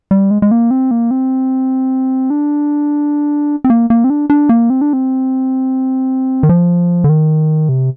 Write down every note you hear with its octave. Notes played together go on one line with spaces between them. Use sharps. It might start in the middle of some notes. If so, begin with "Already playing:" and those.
G3
G#3
G#3
A#3
C4
A#3
C4
D4
C4
A#3
A#3
C4
D4
D4
A#3
C4
D4
C4
D#3
F3
D3
D#3
C3